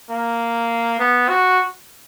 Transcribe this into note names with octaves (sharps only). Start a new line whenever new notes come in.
A#3
B3
F#4